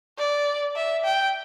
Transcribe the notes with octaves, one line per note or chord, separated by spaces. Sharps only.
D5
E5
G5